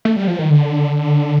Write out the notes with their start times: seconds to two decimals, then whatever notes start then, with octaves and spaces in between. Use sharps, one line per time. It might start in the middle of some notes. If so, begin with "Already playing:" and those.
0.05 A3
0.16 G3
0.27 F3
0.39 D#3
0.50 D3